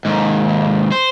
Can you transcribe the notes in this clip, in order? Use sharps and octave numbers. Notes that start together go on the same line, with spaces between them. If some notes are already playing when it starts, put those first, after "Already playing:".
D#2 G#2
C5